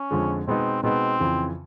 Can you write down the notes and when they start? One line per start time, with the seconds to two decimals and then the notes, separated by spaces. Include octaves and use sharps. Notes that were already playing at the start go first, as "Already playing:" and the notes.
Already playing: C#4
0.11 F2 D3 F3 G#3
0.47 B2 G#3 B3 C4 D#4
0.83 B2 G#3 B3 C4 D#4
1.20 F2 C#3 E3